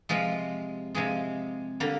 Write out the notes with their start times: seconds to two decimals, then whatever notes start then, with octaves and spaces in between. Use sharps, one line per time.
0.09 C3 F3 G#3 F4
0.95 C3 F3 G#3 G#4
1.80 D3 G3 A#3